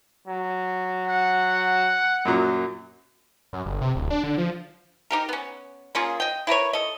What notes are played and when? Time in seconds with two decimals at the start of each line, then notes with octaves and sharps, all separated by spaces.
0.27 F#3
1.07 F#5
2.25 F#2 A#2 F#3
3.53 F#2
3.66 G1
3.81 C3
3.95 D1
4.10 D4
4.24 D3
4.38 F3
5.11 D#4 G4 A#4
5.29 B3 C#4
5.95 A#3 C#4 F4 G#4
6.20 D#5 G5
6.47 E4 A#4 B4 C#5
6.73 A4 D#5